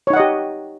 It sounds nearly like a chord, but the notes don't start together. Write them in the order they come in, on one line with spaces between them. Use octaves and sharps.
C#5 D#4 F#5 D#5 G4